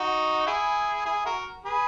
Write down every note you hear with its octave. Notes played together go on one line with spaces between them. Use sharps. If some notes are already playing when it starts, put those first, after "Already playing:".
Already playing: D#4 F#4
E4 G#4
E4 G#4
F#4 A#4
G#4 B4